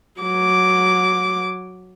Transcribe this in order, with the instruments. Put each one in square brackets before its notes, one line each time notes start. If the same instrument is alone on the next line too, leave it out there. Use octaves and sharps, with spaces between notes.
[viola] F#3 D6